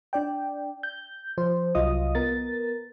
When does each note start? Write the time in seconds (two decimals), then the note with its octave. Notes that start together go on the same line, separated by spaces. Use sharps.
0.13 D4 D5 G5
0.83 G6
1.38 F3 C5
1.75 C2 F#3 F4 D#5 D#6
2.15 B3 A#4 A6